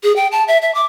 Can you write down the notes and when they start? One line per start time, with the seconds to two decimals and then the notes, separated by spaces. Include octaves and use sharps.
0.03 G#4
0.16 G5
0.32 A5
0.48 E5
0.62 E5
0.75 D6